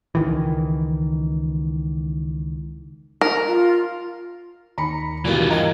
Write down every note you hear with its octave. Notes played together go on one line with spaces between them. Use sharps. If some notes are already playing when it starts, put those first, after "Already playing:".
C#2 D#3 E3
A#4
F4
D#2 D#3 A#5 B5 C#7
G2 B2 E3 F4 G4 A#4 D5
A#4 D#5 G5 A#5 G#6